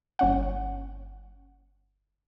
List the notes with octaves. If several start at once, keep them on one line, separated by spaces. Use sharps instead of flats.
G1 C#4 F#5